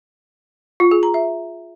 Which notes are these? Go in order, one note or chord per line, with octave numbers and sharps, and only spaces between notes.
F4
G#4
A#5
E5